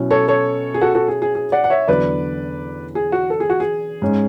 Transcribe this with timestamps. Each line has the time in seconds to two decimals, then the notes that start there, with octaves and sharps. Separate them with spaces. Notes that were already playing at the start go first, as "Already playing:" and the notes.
Already playing: B2 F#3 C#4 E4
0.11 A4 C#5
0.28 A4 C#5
0.74 G#4
0.81 F#4 A4
0.95 F#4 A4
1.08 G#4
1.22 G#4
1.35 G#4
1.52 D5 F#5
1.64 F#5
1.70 C#5 E5
1.88 E2 D3 F#3 B3 D4 B4 D5
2.95 G#4
3.12 F#4
3.30 A4
3.40 G#4
3.50 F#4
3.60 G#4
4.02 G#2 G#3 C#4